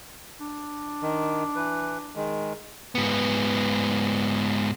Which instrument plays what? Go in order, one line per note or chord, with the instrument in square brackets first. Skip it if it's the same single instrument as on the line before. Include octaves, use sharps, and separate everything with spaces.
[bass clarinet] D4
[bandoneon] D#3
E3 B4
D#3 G#3
[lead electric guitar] G#2 B3